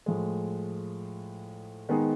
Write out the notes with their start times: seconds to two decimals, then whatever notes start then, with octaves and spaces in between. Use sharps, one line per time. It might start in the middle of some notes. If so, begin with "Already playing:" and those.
0.06 A2 F3 G#3
1.89 D#3 G#3 B3 D#4 G#4